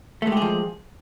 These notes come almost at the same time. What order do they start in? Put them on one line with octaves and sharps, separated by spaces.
A3 G#3 G4 G#4 F3